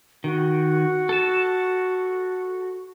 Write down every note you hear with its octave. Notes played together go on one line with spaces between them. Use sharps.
D#3 F#4
A4 A5